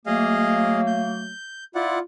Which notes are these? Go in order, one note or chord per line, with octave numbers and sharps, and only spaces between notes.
F#3 A3 A#3 G#4 D#5 F5
G6
E4 F4 D5 F#5